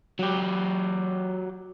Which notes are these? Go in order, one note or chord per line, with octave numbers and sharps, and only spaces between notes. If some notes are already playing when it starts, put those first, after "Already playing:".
F#3 G4